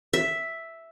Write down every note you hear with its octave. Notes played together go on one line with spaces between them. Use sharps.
E5